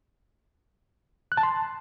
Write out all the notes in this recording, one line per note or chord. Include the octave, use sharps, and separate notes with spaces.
F#6
A5
C6